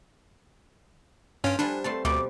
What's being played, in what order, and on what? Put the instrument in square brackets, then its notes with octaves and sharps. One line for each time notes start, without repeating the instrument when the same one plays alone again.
[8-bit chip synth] G2 C#4 C#5 [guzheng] F4 G5 [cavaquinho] F5
[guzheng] F3 G3 B4 [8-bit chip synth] D4 [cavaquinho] A4 G#5
[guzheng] G3 A3 C4 [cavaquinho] A5 C6
[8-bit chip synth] D2 [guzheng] B2 F3 G3 [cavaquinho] D5 D6